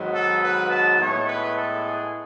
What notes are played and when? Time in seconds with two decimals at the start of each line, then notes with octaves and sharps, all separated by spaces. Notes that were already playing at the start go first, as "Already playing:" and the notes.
Already playing: G#2 D#3 F#3 B3
0.14 A4
0.42 B4
0.70 A5
0.99 A2 G#3 B3 C#5
1.28 B4
1.56 A4
1.85 G#4